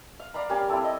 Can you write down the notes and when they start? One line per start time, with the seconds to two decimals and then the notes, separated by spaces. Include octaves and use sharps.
0.20 F5
0.34 D5 F5 A#5 B5
0.49 G3 A#3 C#4
0.68 C4 E4 A4 D5
0.84 D#5